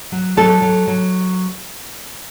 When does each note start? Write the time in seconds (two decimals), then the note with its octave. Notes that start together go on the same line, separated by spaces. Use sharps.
0.12 F#3
0.37 F#3 A4
0.62 F#3
0.87 F#3